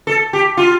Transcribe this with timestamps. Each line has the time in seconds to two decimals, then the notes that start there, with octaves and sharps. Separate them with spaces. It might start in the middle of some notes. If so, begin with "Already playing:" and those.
0.07 A4
0.33 G4
0.57 F4